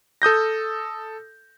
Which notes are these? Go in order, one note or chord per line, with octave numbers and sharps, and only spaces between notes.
A4 D#6 G6 A#6